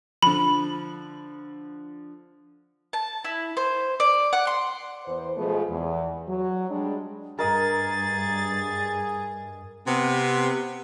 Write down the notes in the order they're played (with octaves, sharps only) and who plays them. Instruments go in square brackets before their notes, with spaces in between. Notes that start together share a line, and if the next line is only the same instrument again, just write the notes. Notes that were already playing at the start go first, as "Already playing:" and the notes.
[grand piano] D3 F3 [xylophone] B5
[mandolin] A5
E4
C5
D5
F#5
C6
[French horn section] E2 C5
B2 F3 G#3 A3 B3 G#4
E2
F#3
G3 G#3 D4
[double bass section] G2 [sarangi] G#4 [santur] A#4 D#5 A#5 [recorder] A6
[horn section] C3 B3